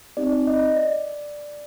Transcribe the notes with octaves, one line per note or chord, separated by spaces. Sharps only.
C4 D#4 G4 D5
D#5
D5